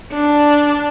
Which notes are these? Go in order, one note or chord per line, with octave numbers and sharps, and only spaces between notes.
D4